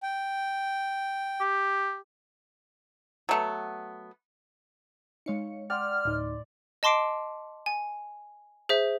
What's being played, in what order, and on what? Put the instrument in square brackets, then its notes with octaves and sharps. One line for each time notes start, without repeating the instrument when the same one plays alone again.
[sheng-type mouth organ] G5
[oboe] G4
[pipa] F#3 A3 B3
[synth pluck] G#3 F5 C#7 [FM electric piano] D#4 C#5
[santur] D5 C6 [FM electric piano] F#5 G5 [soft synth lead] F6
[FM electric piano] D2 D#4 [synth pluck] A2
[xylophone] D#5 A5 C6 D6 C7 D7
G#5
G#4 C5 E5